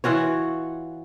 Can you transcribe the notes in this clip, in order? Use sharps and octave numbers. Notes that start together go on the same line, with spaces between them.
E3 F4 F#4 C#5